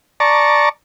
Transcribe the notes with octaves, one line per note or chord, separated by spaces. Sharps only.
D5 A5 A#5 C#6